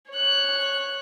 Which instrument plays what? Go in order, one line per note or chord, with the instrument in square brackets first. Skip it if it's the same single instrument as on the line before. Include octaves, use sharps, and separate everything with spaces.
[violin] C#5 F#6